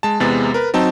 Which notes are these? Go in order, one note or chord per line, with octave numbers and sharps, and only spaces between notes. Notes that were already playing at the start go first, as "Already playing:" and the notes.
G#3 A5
E2 C3 G#3 B3 A6
A#4 B4
F#3 C4 D#4 A5